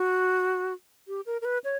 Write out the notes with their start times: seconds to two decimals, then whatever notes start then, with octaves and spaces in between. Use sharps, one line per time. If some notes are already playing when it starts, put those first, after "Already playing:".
Already playing: F#4
1.08 G4
1.26 A#4
1.41 A#4
1.45 B4
1.64 C#5